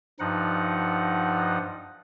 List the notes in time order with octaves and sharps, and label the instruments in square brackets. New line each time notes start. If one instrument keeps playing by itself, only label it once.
[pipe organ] G2 F3 D#4 F#5